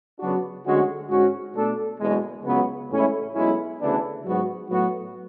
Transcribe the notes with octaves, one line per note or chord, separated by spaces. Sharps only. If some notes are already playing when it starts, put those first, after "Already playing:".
C#3 F#3 B3 D4 F#4
D2 D3 G#3 C#4 F#4
G#2 G#3 C#4 F#4
B2 A3 D4 A4
F#1 E2 B2 G#3
C#2 C#3 F#3 B3
A1 A2 G#3 C#4 E4
B1 B2 G#3 C#4 E4
D2 C#3 E3 B3 D4
G#2 F#3 B3 F#4
A2 F#3 B3 F#4